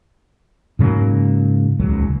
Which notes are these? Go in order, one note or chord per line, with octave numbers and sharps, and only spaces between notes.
G#2 C#3 F#3 A#3
D#1 C#2 A#2 F#3